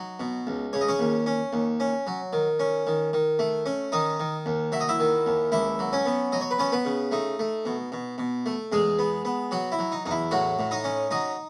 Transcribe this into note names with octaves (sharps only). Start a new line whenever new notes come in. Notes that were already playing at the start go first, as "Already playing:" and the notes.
Already playing: F#3 D#4
B2
C#2
C#3 C#5
D#5
C#4 C#5
D#2
C#4
D#2
C#4
F#3
D#3
C#4
D#3
D#3
A3
C#4
D#3 D#4 D#5
D#3
D#2
F#3 E5
D#5
E4 E5
D#3
D#2
C#2 E4 E5
F#3
C#4 C#5
B3
F#3 D#5
C#5
B4
B3 C#4 C#5
B3 B4
C#3
A3 D#4
A3
B2
B2
B2
A3
E2 G#3 G#4
B3
B3
F#3 F#4
E4
F#3
D#4
E2 D#4
E4
A2 F#3 F#4
A2
D#4 D#5
C#4
F#3 D#4 D#5